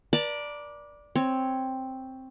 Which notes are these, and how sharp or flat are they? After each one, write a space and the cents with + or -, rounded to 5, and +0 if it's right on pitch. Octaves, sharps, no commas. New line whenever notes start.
B4 -45 D5 +0 A5 +45
C4 +5 C#5 +0